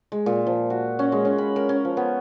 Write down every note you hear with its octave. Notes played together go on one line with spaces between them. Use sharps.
G#3
A#2
F3
F#4
C#4
G#3
C#4
B5
A#4
C#4
F3
B3